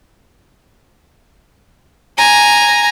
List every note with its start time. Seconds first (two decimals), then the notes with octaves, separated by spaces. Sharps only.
2.18 G#5 A#5